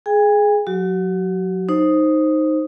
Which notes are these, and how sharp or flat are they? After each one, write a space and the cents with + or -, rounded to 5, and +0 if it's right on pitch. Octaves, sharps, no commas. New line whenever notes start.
G#4 +15 G#5 -45
F#3 -30 F#4 +40
D#4 +0 C5 +10